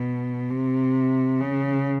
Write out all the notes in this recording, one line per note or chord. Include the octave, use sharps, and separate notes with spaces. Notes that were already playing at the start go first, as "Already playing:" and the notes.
Already playing: B2
C3
C#3